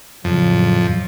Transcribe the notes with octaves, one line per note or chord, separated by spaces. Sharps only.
F2 A2 C#3 F#3